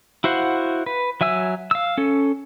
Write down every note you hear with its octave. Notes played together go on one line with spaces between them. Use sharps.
E4 F#4 C5 F5 F#5
B4
F#3 E5 G#5 E6
F5 E6
C#4 A4